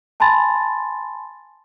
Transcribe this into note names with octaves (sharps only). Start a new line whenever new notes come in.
G#5 A5 B5 C6 A6